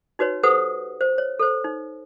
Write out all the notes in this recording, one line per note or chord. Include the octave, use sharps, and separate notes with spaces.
D#4 F#4 B4 C#5
G4 A4 B4 C5 F#5 D#6
C5
C#5
A4 C5
D#4